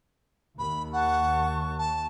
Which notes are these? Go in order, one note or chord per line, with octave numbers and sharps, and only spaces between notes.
D#2 B5
F#5 A5 C#6 F#6
A5